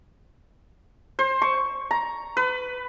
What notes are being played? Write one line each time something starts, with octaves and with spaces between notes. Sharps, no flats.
C5
C#6
A#5
B4